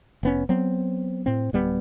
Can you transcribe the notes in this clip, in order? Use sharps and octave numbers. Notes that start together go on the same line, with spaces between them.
F1 B3 C#4
F#3 B3 C4
A2 C4
D1 G3 B3